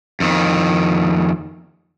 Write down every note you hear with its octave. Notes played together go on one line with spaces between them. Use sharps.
F2 D#3